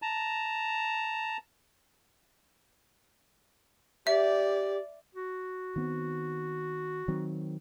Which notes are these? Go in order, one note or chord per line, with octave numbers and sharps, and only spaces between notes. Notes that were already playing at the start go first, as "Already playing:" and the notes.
A5 A#5
G4 D5 E5
F#4
D#3 B3 C4
D#3 F#3 C4